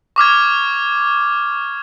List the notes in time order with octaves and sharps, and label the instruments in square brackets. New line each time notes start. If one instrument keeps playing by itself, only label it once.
[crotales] C#6 D6 F6 G#6